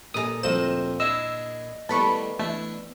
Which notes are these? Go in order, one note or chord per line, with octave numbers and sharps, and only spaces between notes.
A#2 A4 A#4 G#5 A#5 D#6
G1 D2 F3 C4 D#4 A4 C5 E7
D4 E4 G#4 D#5 E6
A2 D#3 G3 B3 A5 B5 C#6
E3 A3 D4 E4